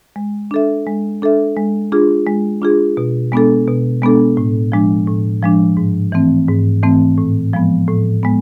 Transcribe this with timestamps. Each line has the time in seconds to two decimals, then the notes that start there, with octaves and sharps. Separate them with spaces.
0.16 G#3
0.51 D4 A4 E5
0.87 G#3
1.22 D4 A4 E5
1.57 G#3
1.92 D4 F4 G#4
2.27 G#3
2.61 D4 F4 G#4
2.97 B2
3.32 G#3 B3 D4 A4
3.68 B2
4.02 G#3 B3 D4 A4
4.37 A2
4.72 F3 G#3 D4
5.07 A2
5.42 F3 G#3 D4
5.77 G#2
6.12 E3 A3 C4
6.48 G#2
6.83 E3 A3 C4
7.18 A2
7.53 F3 G#3 B3
7.88 A2
8.23 G#3 B3